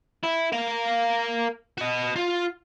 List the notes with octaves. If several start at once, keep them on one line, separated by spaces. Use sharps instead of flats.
E4
A#4 F5
F#4 D#5
F4